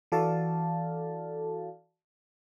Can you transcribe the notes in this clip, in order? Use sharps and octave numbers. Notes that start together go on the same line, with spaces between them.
E3 F#4 A4 D5 F5 A5